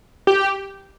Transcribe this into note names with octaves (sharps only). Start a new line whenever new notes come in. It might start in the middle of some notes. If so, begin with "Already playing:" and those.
G4